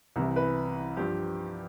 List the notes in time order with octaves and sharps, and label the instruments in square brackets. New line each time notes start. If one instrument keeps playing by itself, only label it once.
[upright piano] C2 C3 E3
B4
G2 F3 G4